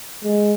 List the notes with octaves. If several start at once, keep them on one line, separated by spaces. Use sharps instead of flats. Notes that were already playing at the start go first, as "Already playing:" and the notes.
G#3